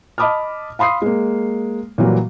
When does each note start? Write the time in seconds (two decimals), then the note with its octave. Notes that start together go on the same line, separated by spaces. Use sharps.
0.18 D#5 A5 B5 D6 D#6 F6
0.79 F5 B5 C6 D#6 C7
1.02 G#3 A#3
1.98 A#2 E3 F#3 G3 A#3